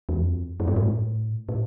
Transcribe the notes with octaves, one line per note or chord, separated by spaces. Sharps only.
E2
F2
F#2
G2
G#2
A2
A2